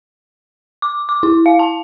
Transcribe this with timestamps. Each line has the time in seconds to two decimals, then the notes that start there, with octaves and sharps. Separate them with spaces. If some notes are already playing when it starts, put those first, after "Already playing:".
0.82 D6
1.09 D6
1.23 E4
1.46 F5
1.59 A5